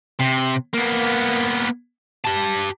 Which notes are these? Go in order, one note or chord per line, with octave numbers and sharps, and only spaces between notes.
C3
A#3 B3
G4 A5